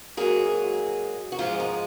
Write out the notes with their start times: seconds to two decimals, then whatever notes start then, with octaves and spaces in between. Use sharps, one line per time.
0.17 G#2 F#3 A#3 G#4
1.32 F#4
1.38 G#2 F3 G#3 F4
1.60 D#4